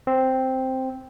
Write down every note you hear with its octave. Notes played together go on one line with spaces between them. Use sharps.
C4